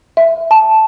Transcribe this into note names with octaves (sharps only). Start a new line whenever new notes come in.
E5
A5